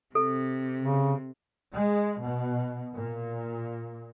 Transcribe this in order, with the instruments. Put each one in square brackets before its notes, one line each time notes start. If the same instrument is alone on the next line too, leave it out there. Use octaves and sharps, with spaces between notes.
[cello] C3 [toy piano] A4
[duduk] C#3
[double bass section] G#3
B2
A#2